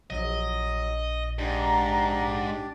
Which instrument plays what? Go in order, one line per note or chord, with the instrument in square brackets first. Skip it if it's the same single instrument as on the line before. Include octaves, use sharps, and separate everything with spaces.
[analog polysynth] A#1 [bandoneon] F#3 [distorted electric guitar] D#5
[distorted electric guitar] G#2 [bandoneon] D4 G4 D5 [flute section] A#5